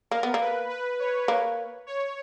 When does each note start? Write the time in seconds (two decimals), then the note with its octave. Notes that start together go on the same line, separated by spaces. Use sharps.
0.11 A#3 A#4
0.23 B3
0.34 A#3
0.40 B4
0.69 B4
1.00 C#5
1.28 A#3
1.87 C#5